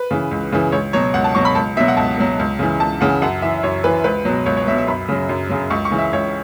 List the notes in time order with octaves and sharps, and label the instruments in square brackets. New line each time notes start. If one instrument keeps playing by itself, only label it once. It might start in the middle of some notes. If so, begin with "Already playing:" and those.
Already playing: [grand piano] B4
C#3 E3
C#2
C#3 E3
C#2 C#5
B2 F#3 C#5
C#2 F#5
A5
B2 F#3 C#6
B5
C#2 A5
B2 E5
F#3
F#5
C#2 A5
B2 F#3
C#2
C#3 E3
C#2 A5
C#3 E3 F#5
F#2 F#5
E3 E5
F#2 C#5
E3 B4
C#2 B4
B2 F#3
C#2 C#5
C#5
F#3 E5
B2
E5
F#2 B5
C#3 F#3
F#2
C#3 F#3
C#2 C#6
C#6
C#3 E3
E5
C#2 C#5